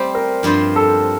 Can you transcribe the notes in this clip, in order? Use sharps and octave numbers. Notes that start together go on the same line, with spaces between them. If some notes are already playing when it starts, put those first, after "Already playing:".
Already playing: G3 A3 C4 G4 C5
A#4
G2 F3 C4 F4 C5
A4